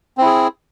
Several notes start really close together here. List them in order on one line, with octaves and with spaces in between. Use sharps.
C4 E4 G#4